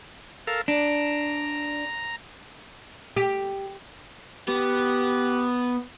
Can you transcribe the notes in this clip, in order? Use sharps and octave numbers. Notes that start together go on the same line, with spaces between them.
A4 A#4 F5
D4 A#5
G4
B3 G4